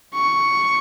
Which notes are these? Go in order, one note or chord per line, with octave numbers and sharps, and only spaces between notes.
C#6